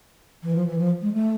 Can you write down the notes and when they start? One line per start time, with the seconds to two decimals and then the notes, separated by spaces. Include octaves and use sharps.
0.43 E3
0.55 F3
0.67 E3
0.78 F3
1.02 G#3
1.13 A3